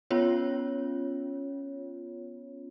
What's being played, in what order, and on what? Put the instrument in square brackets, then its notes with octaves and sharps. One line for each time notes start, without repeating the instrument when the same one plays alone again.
[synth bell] B3 C#4 F4 C#5